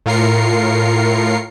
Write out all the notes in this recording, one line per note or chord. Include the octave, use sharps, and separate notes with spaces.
A2 F4 A#4 C7 C#7